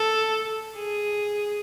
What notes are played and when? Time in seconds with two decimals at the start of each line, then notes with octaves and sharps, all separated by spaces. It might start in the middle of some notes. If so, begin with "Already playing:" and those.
Already playing: A4
0.77 G#4